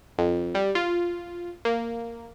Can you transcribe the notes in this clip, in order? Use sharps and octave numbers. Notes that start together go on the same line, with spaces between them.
F2
G3
F4
A#3